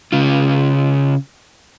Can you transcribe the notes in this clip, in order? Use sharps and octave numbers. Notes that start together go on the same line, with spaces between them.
C#3 F4